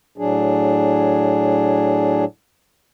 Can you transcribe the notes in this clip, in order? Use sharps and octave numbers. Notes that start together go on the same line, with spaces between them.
A2 F#3 D4 G#4